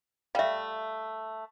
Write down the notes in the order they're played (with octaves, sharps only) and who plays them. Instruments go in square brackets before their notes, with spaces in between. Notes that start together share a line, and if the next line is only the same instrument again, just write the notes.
[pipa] G3 A3 [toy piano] E5 F5